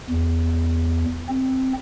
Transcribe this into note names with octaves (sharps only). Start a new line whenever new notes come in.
E2
C4